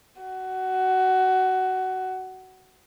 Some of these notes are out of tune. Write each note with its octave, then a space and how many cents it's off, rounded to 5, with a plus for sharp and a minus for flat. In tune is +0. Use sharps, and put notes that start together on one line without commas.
F#4 +15